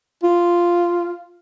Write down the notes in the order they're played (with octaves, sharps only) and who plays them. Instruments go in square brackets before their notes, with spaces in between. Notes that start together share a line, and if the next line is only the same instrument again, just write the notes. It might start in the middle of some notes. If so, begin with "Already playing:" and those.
[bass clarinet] F4